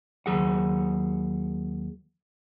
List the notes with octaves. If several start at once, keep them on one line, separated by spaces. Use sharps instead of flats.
D#2 F#3 G#4 F#5